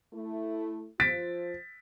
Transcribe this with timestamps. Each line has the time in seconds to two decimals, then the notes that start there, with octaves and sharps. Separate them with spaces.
0.13 A3 E4
1.00 F3 F4 C5 A6 B6 D7